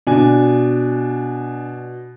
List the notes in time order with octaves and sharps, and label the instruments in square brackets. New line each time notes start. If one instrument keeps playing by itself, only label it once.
[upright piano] B2 [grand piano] D4 G#5